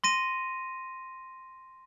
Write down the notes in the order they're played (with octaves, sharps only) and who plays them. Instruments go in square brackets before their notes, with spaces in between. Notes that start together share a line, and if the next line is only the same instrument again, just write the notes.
[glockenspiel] C6 A#6 D#7